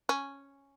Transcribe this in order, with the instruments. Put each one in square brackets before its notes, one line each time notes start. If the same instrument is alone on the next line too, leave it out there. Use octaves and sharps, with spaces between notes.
[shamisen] C#4